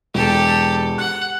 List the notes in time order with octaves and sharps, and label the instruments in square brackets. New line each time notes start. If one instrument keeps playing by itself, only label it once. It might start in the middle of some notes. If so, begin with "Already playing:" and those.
[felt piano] E1 [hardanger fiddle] G4 A4
[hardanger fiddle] F#5 [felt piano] F#6